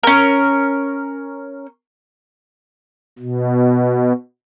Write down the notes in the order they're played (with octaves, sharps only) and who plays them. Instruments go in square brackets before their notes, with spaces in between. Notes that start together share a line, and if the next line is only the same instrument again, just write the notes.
[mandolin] C#4 A#4
[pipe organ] B2